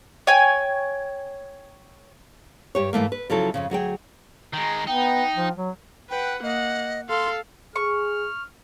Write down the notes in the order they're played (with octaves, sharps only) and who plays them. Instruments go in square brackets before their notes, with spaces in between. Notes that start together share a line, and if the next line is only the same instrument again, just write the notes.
[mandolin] C#5 G5 G#5
[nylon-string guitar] G2 G4 C#5
G#2 E3 A3 A#3
B4
C#3 F3 F#3 E4 A4
F2 A2 C#3
D2 F#3 G#4 G5
[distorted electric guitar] D#3 G#3 [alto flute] A#5
[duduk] B3 [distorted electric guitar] D#4 [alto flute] G5
[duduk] F3
F#3
[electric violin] B4 F#5 [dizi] G5
[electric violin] A#3 F#5 [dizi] D#5
[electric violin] A4 F5 [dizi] C6
[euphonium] G#4 [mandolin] C#6 [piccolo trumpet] F6